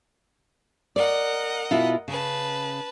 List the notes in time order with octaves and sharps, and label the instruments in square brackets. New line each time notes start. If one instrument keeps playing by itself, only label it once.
[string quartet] A#4 D#5 F#5 [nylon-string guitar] D5
[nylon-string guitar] B2 E4 F4
[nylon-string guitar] C#3 [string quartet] B4 A5